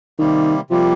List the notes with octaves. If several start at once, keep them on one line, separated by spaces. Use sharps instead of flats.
C3 D#3 G3 A#3
C3 F3 G3 A#3